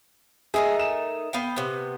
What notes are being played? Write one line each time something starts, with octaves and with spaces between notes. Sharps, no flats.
A3 D#4 G#4 A#4
E7
B3 F5 G5
C3 B3